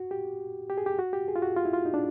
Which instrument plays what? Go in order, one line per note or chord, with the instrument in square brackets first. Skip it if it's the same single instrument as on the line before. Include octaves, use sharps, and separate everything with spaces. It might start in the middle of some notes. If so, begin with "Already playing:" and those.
Already playing: [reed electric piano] F#4
G4
G4
G#4
G4
F#4
G4
G#4
F4
F#4
F4
E4
F4
D#4
D4